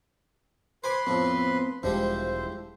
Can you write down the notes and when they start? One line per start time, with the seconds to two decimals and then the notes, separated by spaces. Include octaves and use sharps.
0.84 B4 C5 G#5 C6 D6
1.07 F2 A2 F3 B3 C4
1.83 E1 F3 G3 G#3 E4 C5